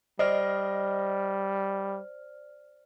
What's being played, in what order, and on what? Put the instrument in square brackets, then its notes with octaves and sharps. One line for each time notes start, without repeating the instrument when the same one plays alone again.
[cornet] G3 [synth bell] C5 D5 F6 [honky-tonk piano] D#5